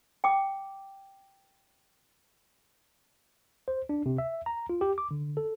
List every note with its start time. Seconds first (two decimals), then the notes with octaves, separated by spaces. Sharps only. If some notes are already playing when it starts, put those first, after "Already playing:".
0.24 G5 D6
3.68 C5
3.89 D4
4.06 C3
4.18 E5
4.46 A#5
4.70 F4
4.81 G4
4.98 D6
5.11 D3
5.37 A4